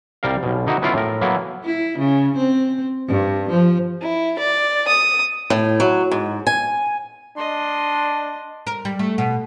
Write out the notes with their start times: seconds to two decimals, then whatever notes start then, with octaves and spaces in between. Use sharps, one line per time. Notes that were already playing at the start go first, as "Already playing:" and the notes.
0.23 C2 G3 A#4 F5
0.43 B1 B2
0.67 D3 D#4 E4 F#4
0.82 F#3 B3 C#4 E4 F4 F5
0.94 A2 A#4
1.21 F#3 A#3 B3 E4 A4 B4
1.64 E4
1.98 C#3
2.37 C4
3.08 G2
3.50 F3
4.01 E4
4.38 D5
4.88 D#6
5.50 A2
5.80 F#3
6.11 G#2
6.47 G#5
7.37 D4 D#5 C6
8.67 A#4
8.85 G3
8.99 A3
9.18 B2